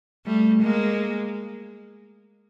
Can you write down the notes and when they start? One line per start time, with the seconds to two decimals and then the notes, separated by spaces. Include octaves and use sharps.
0.26 G3 A3
0.62 G#3 A#3